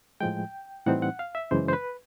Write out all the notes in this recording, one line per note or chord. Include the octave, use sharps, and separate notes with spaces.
A2 F3 G#3 G5
A2 E3 G3 C4 D#4 F#5
F#5
F5
E5
F#2 C#3 E3 G#3 C5
C5
B4